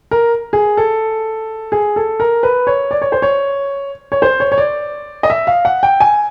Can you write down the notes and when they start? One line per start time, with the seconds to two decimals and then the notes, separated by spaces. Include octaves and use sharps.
0.11 A#4
0.53 G#4
0.77 A4
1.72 G#4
1.96 A4
2.20 A#4
2.43 B4
2.67 C#5
2.91 D5
3.02 C#5
3.12 C5
3.22 C#5
4.12 C#5
4.22 C5
4.40 C#5
4.52 C#5
4.58 D5
5.23 D#5
5.30 E5
5.47 F5
5.65 F#5
5.83 G5
6.00 G#5